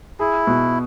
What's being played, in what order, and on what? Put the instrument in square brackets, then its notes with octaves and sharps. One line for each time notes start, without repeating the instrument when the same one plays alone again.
[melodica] E4 [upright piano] G#4
[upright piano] B2